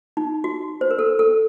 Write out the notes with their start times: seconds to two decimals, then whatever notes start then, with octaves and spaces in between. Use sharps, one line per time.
0.17 D#4
0.44 F#4
0.81 C5
0.91 A#4
0.99 A4
1.19 A4